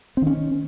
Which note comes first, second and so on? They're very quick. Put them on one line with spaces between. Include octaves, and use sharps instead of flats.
C4 D#3 C#4